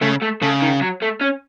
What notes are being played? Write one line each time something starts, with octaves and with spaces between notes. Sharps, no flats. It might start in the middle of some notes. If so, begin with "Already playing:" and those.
C#3 A3
A3
C#3 A3
D#3
F#3
A3
C#4